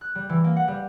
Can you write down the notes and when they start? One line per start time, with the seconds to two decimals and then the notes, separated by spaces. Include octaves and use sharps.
0.01 F#6
0.15 G3
0.29 E3
0.44 A#3
0.56 F#5
0.68 G3